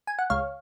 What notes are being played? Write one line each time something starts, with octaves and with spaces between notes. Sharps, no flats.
G#5
F#5
C#2 C#5 F5